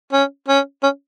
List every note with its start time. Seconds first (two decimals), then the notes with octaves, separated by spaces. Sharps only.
0.13 C#4
0.48 C#4
0.83 C#4